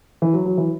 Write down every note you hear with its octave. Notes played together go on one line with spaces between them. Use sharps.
E3
F#3
F#3
E3